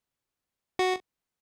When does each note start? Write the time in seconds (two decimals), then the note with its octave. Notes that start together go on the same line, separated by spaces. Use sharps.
0.79 F#4